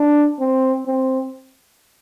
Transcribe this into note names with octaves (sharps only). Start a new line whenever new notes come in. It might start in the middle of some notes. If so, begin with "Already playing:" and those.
Already playing: D4
C4
C4